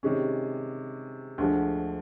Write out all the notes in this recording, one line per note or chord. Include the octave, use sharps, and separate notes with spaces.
C3 D#3 G#3 C#4
D2 D3 F3 G#3